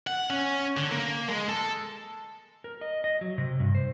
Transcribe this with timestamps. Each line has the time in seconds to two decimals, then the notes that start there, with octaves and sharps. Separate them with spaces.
0.07 F#5
0.30 C#4
0.77 D3
0.92 A#3
1.29 G#3
1.49 A4
2.64 A#4
2.81 D#5
3.04 D#5
3.21 F#3
3.38 C3
3.60 G2
3.75 C5